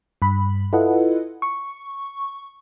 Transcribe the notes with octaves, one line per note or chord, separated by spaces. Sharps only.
G2 B5
E4 F4 A4 B4 D#5 F#5
C#6